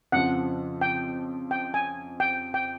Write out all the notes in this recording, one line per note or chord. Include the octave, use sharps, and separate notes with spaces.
F2 C#3 F3 F#5
G5
G5
G#5
G5
G5